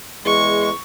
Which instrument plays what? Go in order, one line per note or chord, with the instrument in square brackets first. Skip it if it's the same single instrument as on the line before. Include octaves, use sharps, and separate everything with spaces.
[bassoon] E2 [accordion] G#3 [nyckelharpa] C#6